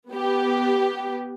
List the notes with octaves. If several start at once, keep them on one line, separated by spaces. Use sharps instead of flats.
B3 G4